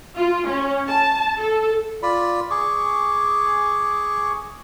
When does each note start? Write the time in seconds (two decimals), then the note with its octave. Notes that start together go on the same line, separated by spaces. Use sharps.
0.16 F4
0.47 C#4
0.88 A5
1.38 A4
2.03 F4 D5 B5
2.50 G#4 C#6 D6